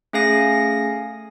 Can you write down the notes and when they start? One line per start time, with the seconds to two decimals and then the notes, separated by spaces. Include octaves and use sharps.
0.13 A3 C#4 G#4 F5 G#5 A#6